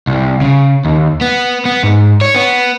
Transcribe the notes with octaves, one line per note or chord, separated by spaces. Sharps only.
C2
C#3
D#2
B3
B3
G#2
C#5
B3